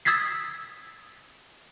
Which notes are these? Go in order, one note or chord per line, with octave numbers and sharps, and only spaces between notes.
D#6 E6 G#6 A6 B6 C7